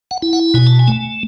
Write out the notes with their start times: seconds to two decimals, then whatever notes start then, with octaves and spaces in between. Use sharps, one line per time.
0.11 F#5
0.22 E4
0.33 F#5
0.54 B2 G#5
0.67 A5
0.79 G#5
0.88 A3